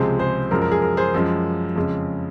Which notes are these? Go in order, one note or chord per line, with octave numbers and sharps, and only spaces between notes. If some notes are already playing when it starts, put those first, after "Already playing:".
Already playing: C#2 C3 F3 G#3 G#4 C5
G#4 C5
F#2 F3 G#3 A#4
A#4
G#4
A#4
G#4 C5
F#2 F3 G#3
F2 C#3 G#3